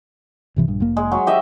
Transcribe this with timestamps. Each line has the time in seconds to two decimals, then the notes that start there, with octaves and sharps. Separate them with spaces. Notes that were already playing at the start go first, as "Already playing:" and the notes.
0.56 G1 C3 E3
0.68 A#1 G2
0.80 F1 A#3
0.97 G#3
1.12 F#3
1.27 G4 D#5 E5